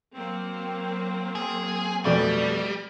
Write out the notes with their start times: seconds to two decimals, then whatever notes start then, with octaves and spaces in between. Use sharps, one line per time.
0.15 F#3 A#3 C4
1.35 G#4
2.05 F2 B2 G3 A3 D5